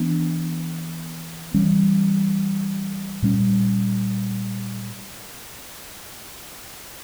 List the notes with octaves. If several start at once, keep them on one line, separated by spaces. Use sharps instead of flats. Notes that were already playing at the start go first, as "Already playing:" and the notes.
Already playing: E3 B3 D4
E3 G3 C#4
A#2 G3 C#4